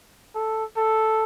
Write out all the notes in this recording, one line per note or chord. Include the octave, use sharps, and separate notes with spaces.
A4
A4